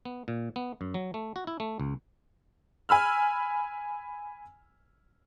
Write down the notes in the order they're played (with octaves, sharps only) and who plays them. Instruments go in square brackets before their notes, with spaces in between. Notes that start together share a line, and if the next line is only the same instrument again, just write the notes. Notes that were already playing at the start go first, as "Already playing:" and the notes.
[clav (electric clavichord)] B3
A#2
B3
F#2
F#3
A3
F#4
E4
A3
C#2
[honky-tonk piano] G#5 B5 E6 F6